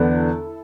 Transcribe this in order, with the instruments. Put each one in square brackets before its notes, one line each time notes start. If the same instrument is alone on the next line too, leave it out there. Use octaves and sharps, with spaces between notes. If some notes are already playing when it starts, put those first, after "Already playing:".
Already playing: [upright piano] E2 D3 B3 D4 [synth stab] E4 A4